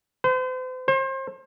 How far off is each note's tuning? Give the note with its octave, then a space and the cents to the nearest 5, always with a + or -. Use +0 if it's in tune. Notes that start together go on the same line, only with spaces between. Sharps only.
C5 -40
C5 +35